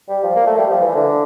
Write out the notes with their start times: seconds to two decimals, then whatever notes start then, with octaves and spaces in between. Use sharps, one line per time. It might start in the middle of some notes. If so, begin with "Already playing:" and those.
0.09 G3
0.23 F3
0.35 A#3
0.47 A3
0.58 G3
0.70 F3
0.81 E3
0.95 D3